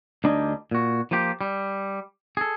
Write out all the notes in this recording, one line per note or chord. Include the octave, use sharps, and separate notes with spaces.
D2 G3 D4 D#4 D#5 G#5
A#2 F#4
F3 A#3 F4 G4
G3
G#4 A4